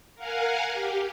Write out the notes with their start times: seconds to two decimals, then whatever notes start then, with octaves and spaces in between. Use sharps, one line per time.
0.15 A#4 F5 F#5 G#5
0.71 G4